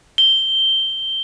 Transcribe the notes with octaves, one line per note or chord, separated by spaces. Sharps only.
G7